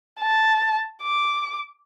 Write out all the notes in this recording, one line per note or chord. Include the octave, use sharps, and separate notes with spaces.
A5
D6